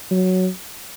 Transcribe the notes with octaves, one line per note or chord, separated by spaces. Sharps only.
F#3